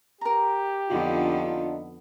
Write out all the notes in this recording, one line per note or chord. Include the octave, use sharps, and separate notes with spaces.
G4 A#4 A#5
F2 D3 B3 D4 D#4 F4